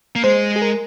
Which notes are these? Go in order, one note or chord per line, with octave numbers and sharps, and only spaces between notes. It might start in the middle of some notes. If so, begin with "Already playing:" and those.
A#3
G#3 C5
G#4
A#4